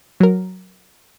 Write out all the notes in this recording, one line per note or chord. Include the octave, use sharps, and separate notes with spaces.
F#3 A#4